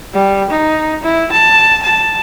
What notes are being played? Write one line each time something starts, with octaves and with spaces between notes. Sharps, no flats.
G3
D#4
E4
A5
A5